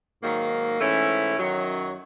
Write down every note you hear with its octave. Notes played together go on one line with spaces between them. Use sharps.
G#2 D#3 F#3 A#3
G#2 E3 A3 C#4 E4
F#2 D#3 F#3